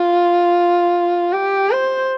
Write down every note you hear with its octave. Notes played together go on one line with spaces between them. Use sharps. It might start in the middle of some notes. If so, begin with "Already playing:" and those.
Already playing: F4
G4
C5